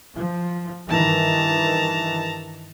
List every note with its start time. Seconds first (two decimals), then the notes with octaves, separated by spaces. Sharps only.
0.15 F3
0.89 G2 D#3 E3 A5 A#5